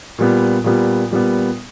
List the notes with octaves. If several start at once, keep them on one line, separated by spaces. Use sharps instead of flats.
A#2 G3 B3
A#2 G3 B3
A#2 G3 B3